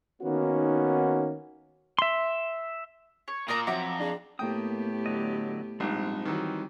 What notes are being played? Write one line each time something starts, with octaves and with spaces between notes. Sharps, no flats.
D#3 A#3 B3 C#4 D#4 F#4
E5 C6
C#5
A#2 A#4 D5 A#5 D#6
F2 F#3 E5 F#5 A#5 D6
D4 G#4
A2 A#3 B3 G4 G5 D#6
D3 F#3 D#5
A#1 G#2 G3 C4 D#4
D#3 E3 F#3